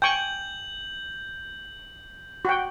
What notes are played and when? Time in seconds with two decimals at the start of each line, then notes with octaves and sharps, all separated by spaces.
0.02 G5 G#5 C#6 G6 F#7
2.45 F#4 G5